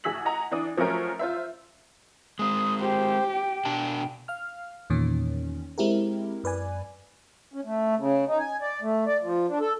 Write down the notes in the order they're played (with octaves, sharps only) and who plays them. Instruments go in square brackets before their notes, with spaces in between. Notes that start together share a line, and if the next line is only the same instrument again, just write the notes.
[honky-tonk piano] A1 F#4 G#4 E6 B6 F#7
D#5 F#5 G#5 A#5
E3 D4 D#6
F3 F#3 A3 C#4 A#4
F4 C5 E5
[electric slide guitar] G#3 C4 [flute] D#6
[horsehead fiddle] G4 [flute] C5
[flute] G5
[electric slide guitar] B2 D4 A5
[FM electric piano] F5 F6
E2 A#2 D#3 C#4
G#3 C4 E4 G4 A#4
F#2 B4 D5 G#5
[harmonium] C#4
A3
C#3
D#4
G#5
D5
A3
D5
F3
D4
A4